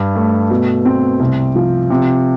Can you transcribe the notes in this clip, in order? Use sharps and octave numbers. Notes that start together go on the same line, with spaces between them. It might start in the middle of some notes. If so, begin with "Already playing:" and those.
Already playing: G2
A3
B2
C4
C2
F3
C3